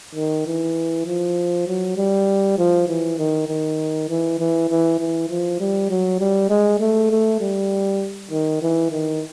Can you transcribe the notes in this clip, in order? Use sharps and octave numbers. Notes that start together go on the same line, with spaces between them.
D#3
E3
F3
F#3
G3
F3
E3
D#3
D#3
E3
E3
E3
E3
F3
G3
F#3
G3
G#3
A3
A3
G3
D#3
E3
D#3